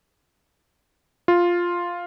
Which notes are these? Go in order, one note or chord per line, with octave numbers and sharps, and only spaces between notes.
F4